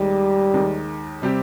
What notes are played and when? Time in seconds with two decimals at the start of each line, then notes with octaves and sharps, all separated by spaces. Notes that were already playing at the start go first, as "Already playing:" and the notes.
Already playing: D#2 D#3 G3 G#3
0.54 D#2 D#3 G#3
1.22 C3 G3 C4 G4